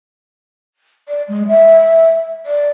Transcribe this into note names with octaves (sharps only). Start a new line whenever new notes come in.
D5
G#3
E5
D5